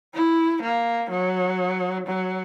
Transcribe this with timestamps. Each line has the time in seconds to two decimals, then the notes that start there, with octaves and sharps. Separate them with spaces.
0.15 E4
0.63 A#3
1.11 F#3
2.07 F#3